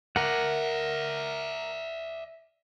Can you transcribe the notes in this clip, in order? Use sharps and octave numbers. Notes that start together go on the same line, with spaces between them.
A#4 D5 E5 F#5